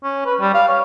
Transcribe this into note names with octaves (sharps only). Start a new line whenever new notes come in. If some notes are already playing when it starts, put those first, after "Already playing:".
C#4
B4
G3
F5
C#5